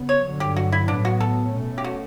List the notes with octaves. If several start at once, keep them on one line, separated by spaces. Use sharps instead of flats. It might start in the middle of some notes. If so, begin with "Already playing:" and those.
Already playing: C#3 B3
C#5
G2 D3 F#3
G4
F#4
E4
A2 F#3 B3 D4
F#4
A4
B2 A3 C#4
G4
F#4